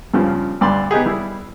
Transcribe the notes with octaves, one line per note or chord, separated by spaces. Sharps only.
G2 C#3 F3
D2 G2 D5 B5 C6
B3 D#4 G4 G#4
G3 E4